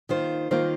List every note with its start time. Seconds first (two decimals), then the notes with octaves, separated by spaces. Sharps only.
0.09 D#3 A#3 F4 C5
0.51 D#3 A#3 F4 C5